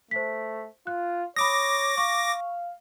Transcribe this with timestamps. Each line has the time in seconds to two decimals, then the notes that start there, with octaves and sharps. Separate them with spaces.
0.11 A3 C5 B6
0.87 F4 F#6
1.36 C#5 B5 D6 D#6 A#6
1.98 F5 C#6